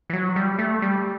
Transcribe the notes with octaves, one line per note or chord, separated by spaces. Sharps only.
E3
F#3
G3
A3
G3